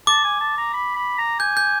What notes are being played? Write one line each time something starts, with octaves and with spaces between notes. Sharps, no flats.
A5 D6
G#5
A5
A#5
B5
B5
A#5
G#5 G6
G6